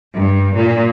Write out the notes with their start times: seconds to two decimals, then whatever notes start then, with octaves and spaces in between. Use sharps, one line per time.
0.17 G2
0.56 A#2